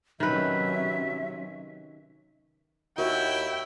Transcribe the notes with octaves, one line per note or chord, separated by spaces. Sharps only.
C3 D#3 F#3 C#4 B4 E5
D#2 E4 F#4 G5